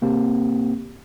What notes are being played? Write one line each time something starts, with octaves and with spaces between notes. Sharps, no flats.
C3 A#3 C4 G4